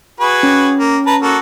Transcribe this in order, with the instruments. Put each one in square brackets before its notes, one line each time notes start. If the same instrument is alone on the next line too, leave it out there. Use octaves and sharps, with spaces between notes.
[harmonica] F#4 G#4 B4
[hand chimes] C#4
[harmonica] A#3
B4 A5 A#5
A#3 F#4 A4